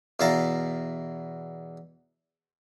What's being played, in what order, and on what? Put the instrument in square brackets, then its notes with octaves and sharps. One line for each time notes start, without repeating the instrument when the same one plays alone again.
[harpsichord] E2 B2 E5 F5 A5 A#5